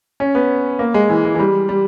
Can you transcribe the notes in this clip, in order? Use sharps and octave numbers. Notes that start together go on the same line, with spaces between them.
C#4
B3
A#3
G#3
E3
E3
E3
G3
G3